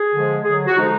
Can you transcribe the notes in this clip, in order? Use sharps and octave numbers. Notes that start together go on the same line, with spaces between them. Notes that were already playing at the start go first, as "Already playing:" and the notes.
Already playing: G#4
D3 F3 G#3
D3 F#3 G#4
F#4
D3 F3 G#3 D#4